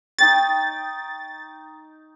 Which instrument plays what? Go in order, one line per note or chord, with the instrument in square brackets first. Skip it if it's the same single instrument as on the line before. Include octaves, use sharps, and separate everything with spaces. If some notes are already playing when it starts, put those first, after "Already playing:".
[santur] D#4 G5 C#6 [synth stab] A6